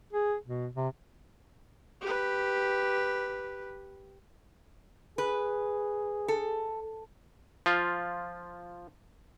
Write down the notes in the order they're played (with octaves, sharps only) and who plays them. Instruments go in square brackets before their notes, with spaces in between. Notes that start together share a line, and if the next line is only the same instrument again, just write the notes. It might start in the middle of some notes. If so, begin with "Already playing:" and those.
[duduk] G#4
B2
C3
[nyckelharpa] G4 B4
[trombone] G#4 [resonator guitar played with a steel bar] B4
[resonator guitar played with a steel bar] A4
[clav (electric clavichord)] F3 F4